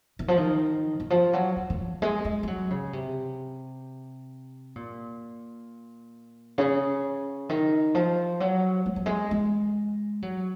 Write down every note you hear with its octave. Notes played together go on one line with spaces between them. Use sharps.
D#3
F3
D#3
D#3
F3
F#3
D#3
D#3
F3
G#3
G#3
G#3
F#3
C#3
C3
A#2
C#3
D#3
F3
F#3
G#3
F#3
G#3
G#3
F#3